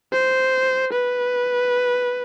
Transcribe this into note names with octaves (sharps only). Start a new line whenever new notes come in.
C5
B4